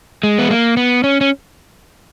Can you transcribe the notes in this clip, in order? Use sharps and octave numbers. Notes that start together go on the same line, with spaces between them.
G#3
B3
A#3
B3
C#4
C#4